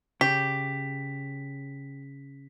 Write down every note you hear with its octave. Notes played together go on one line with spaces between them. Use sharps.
C#3 G4 B6